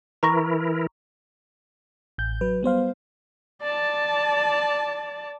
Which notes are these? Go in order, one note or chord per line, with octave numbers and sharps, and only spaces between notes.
E3 E4 A#4 A#5 C#6 A#6
A1 G6
F#3 B4
G3 B3 C5 F5
D5 A5